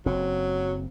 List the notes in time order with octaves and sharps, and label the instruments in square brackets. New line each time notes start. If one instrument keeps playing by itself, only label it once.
[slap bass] F#1 C4 [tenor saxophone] F#3